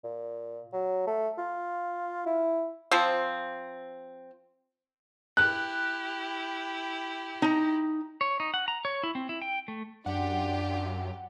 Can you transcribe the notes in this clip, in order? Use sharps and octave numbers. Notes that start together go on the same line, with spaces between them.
A#2
F#3
A3
F4
E4
F3 C4
E4 G4 F#6
D#4 A#5
C#5
D#4
F#5
A#5
C#5
E4
C4
E4
G5
A3
F#2 D4 F4 G4 D5 F#5